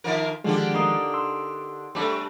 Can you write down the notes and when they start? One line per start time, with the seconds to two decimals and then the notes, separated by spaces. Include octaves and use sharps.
0.04 D#3 F3 A#4
0.44 D3 D#3 F3 G#3 D4 F4 G4
0.74 A#3 D#4
1.14 C6 E6
1.95 C3 G3 A3 C4 D4 G4